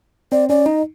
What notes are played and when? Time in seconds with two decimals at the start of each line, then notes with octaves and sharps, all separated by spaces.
0.32 C4 D5
0.49 C#4 D5
0.66 D#4 D#5